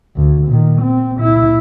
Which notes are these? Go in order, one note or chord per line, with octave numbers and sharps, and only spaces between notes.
D2
A#2 D#3
C4
A#2 E4